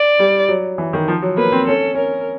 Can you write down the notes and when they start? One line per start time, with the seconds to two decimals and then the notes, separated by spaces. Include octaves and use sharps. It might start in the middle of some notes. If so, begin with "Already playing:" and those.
Already playing: D5
0.19 G3
0.49 F#3
0.78 E3
0.93 D#3
1.08 F3
1.22 F#3
1.37 A#3 B4
1.52 C4
1.67 C#4 A4
1.94 C#4 A#4